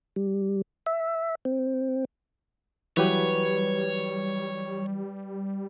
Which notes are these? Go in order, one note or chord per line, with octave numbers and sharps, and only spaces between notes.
G3
E5
C4
E3 F#3 G3 G4 B4 C#5